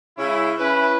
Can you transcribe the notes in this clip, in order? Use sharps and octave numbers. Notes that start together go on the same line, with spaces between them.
C#3 G#3 C#4 E4
C#4 E4 B4